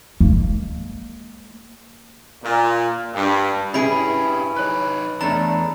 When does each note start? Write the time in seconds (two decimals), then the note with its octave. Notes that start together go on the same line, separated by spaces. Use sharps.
0.20 G#3 A#3
2.43 A#2
3.14 G2
3.74 C#4 E4 G4 G#4 B4 B5 D7
4.56 D#4 B4 C#5 F#6
5.21 E2 A3 D4 A#5